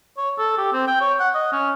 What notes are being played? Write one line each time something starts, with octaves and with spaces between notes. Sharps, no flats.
C#5
A4
G4
C4
G5
C#5
F#5
D#5
C#4